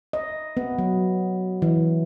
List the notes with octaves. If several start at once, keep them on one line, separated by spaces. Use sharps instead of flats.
D#5
B3
F#3
E3